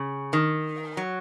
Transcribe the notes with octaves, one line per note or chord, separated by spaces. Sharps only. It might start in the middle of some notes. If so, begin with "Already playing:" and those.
Already playing: C#3
D#3
F#3